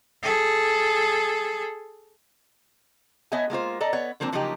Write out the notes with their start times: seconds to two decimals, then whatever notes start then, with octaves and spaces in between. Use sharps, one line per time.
0.22 G#4 A4
3.32 B3 C#5 D#5 E5 G#5
3.50 G#3 A#3 F4 C5
3.81 A4 D5 D#5 A#5
3.93 B3 C#5
4.20 D3 F3 A#3 C4 D4
4.32 C#3 F3 F#3 A#3 D#4 G4